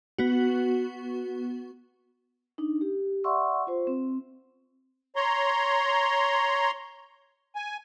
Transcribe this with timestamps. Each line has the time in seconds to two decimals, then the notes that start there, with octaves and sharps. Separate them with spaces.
0.18 B3 F#4
2.58 D4 D#4
2.81 G4
3.24 D5 E5 F#5 C6 C#6 E6
3.67 F4 C5
3.87 C4
5.16 C#5 A#5 C6
7.56 G#5